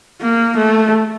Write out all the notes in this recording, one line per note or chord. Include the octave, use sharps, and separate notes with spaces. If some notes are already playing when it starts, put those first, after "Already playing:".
A#3
A3